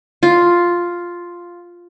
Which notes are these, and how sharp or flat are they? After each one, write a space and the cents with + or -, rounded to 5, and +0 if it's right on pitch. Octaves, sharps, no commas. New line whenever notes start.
F4 +0